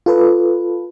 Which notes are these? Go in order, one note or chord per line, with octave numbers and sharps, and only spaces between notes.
F4 A4 B4